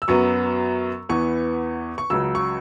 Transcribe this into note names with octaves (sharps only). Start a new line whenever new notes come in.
E6
F#2 F#3 B3 C#6
E2 E3 B3 C#6
C#6
C#2 C#3 F#3 E6
C#6